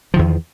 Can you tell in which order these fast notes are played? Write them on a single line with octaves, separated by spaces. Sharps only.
F3 D#3 E2